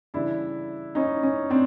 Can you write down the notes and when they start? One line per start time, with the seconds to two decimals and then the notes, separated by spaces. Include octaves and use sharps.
0.14 C#3 E3 G3 D4 E4
0.95 C#4 D#4
1.23 C#4
1.50 C4 D4